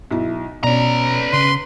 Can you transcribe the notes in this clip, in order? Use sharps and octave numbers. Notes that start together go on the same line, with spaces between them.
B1 E4
B2 C#4 B4 D5 A#5
C#3 C6